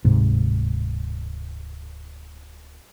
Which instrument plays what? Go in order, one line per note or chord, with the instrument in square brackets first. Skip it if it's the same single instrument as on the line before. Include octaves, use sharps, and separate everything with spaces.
[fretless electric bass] D1 G#2 C3